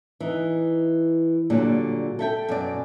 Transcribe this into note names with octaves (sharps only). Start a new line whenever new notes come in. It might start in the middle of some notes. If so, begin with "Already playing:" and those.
E3 D#4
A#2 D3 F#3 G3
A4 E5 G5
F#2 B2 D5